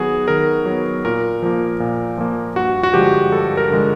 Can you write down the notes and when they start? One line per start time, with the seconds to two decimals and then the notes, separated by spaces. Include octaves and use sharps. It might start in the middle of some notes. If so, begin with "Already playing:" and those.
Already playing: D#3 F#3 B3 F#4 G#4
0.28 D#3 A#4
0.66 F#3 B3
1.05 A#2 A#4
1.42 F3 A#3
1.80 A#2
2.18 F3 A#3
2.56 G2 F#4
2.83 F#4
2.94 D3 F3 G#3 G4
3.32 G2 A4
3.57 A#4
3.70 D3 F3 G#3